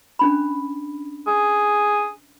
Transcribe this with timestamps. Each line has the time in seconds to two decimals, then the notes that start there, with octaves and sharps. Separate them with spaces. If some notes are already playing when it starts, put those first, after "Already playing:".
0.19 C#4 D4 B5
1.27 G#4